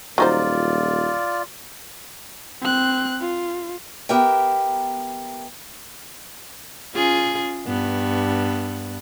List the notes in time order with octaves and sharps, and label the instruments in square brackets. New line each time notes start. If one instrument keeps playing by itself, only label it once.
[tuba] D#1 [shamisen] F#3 D#4 C5 [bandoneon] F4 D5
[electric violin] C4 F#6
F4
[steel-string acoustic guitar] B3 G4 A#4 E5 G5
[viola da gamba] C#4 F4 G#4
G2 B3